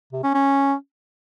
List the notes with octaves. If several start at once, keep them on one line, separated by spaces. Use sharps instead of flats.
C3
C#4
C#4